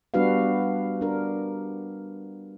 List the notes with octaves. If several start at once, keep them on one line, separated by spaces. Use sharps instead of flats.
G3 B3 D4 F#4 B4 F5
D4 A#4